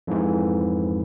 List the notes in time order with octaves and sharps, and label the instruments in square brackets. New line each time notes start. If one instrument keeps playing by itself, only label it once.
[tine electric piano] F2 G#2 E3